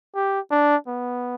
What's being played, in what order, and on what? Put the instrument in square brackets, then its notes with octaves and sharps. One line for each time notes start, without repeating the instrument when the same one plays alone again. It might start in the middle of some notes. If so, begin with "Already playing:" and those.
[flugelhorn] G4
D4
B3